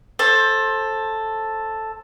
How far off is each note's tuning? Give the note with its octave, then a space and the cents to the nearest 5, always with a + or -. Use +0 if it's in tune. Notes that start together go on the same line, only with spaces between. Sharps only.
A4 +0 C5 +25